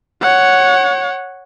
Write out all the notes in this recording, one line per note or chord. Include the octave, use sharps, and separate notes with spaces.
C#5 F#5